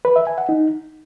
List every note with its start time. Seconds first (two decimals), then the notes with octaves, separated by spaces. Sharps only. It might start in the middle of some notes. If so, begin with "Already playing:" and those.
0.05 B4
0.16 E5
0.27 G#5
0.38 F#5
0.49 D#4